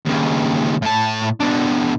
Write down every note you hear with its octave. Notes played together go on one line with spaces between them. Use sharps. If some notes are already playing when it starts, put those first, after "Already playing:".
D#2 C#3
A2 A5
B2 D4